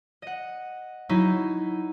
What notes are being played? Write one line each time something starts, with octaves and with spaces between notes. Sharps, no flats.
D#5 F#5
F#3 D#4 E4